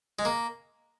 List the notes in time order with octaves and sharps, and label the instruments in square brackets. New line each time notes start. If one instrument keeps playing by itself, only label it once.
[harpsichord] G#3
A#3